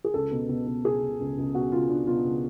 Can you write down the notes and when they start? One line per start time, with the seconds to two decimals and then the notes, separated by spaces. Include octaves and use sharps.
0.04 G#4
0.14 C#2 A4
0.32 B2
0.49 B2
0.67 B2
0.85 B2 G#4
1.02 B2
1.20 C#2
1.38 C#2
1.54 B2 F#4
1.72 C#2 F4
1.89 C#2 D4
2.07 B2 F4
2.24 C#2